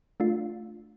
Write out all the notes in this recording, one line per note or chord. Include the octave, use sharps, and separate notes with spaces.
A3 D4 F4